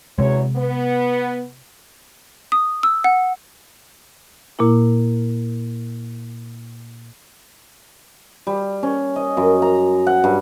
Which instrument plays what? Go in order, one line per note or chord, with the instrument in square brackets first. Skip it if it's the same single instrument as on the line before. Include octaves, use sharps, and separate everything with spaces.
[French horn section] E2 F#3 C#5 [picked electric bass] C3 G#3
[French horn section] B3
[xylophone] D#6
E6
F#5
[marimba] A#2 A#3 E4
[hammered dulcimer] G3
C#4
D#5
F#2
A#5
F#5
G2